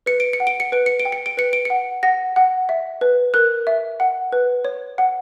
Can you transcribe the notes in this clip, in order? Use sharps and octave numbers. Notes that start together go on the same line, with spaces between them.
B4 C#7
D7
C#7
F#5
D7
C#7
B4 D7
C#7
D7
G5
C#7
D7
B4 C#7
D7
F#5 C#7
F#5 A#6
F#5
E5
B4
A#4 F#6
E5
F#5
B4
C#5
F#5